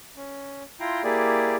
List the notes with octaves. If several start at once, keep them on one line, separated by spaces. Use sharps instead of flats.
C#4
E4 F4 G5 A#5 C6
A#3 E4 G4 G#4 D5